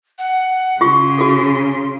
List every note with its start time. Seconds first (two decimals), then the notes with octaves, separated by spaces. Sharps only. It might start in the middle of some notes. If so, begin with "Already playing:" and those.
0.19 F#5
0.81 C#3 F4 G4 C6
1.18 F#4 G#4 A4